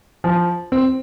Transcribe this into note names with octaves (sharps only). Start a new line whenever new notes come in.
F3
C4